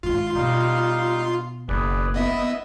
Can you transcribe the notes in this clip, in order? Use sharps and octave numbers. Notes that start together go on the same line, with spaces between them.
G#1 G#2 F4 C6
B2 G3 D#4 F5
F#1 G#4 B4 D5
B3 E4 D#5 E5